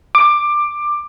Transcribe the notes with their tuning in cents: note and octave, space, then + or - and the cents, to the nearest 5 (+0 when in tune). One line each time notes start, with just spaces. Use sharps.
D6 +15